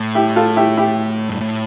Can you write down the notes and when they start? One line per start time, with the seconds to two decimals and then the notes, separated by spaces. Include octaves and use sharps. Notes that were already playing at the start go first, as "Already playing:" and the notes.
Already playing: A2
0.15 E4 G4
0.36 F4 A4
0.56 E4 G4
0.77 E4 G4
1.29 G2
1.41 A2